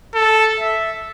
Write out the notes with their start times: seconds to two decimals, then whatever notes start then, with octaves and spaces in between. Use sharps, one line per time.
0.15 A4
0.60 E5